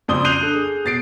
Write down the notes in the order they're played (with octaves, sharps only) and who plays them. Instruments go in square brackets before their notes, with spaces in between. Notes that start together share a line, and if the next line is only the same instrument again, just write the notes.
[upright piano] F2 C#3 D5 C6 D#6 G7
F#6 G6 C7 D#7 F7 G7
D4 A4
G#4
B2 A6 C7 D7